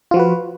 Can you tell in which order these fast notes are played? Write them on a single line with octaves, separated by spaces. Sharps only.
F4 F3 F#4 B4